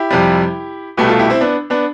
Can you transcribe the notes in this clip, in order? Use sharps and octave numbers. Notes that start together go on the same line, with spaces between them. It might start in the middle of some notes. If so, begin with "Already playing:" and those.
Already playing: E4 G4
F2 C3 G3
C2 B2 A3 G4 B4
F4 A4
E4 G4
C4 E4
B3 D4
B3 D4